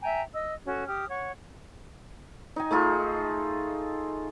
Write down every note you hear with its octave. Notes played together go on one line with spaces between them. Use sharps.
E5 G5 G#5 A#5
D#5 E6
C#4 F#4 A4
G4 D#6 F6
C#5 F#5 C#6
D#4 D#5 G#5
A3 D#4 F4 G#4